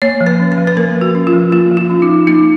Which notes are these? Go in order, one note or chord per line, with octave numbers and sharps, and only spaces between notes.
A#3 C#5
F3
B4
C#4
B4
F3
B4
A#3 A#4
F3
F#4
C#4
F4
F3
A#3 F4
F3
F4
C#4
D#4
F3
A#3 D#4